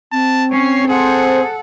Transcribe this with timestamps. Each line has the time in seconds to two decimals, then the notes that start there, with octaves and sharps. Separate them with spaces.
0.12 C4 A5
0.51 C#4 C#5 C7
0.88 G#4 A4 C5 F#5